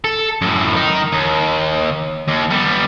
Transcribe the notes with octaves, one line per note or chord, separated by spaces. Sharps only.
A4
F#2 A2
D#3 D#4
D#2
D#2
G3 B3